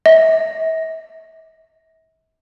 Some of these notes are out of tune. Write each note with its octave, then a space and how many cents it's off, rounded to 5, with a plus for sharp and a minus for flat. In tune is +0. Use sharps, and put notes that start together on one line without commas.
E5 -40